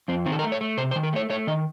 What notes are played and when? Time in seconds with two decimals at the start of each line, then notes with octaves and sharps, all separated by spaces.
0.08 F2 C4
0.25 D#3 C4
0.32 A4
0.39 A#4
0.43 A3
0.52 C#5
0.61 A3
0.77 C3 C5
0.91 C5
0.96 D#3
1.03 A#4
1.13 A3 C#5
1.30 A3 C#5
1.47 D#3 D#5